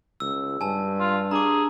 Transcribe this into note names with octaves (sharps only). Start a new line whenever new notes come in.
C#2 E6
G2 G#5 A5
F4
D4 G#4 A#5 D6